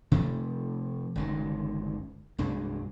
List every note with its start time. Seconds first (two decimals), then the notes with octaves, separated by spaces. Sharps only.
0.12 C3 F3 A3
1.16 G1 C#2 D#3
2.38 C2 G2 G#3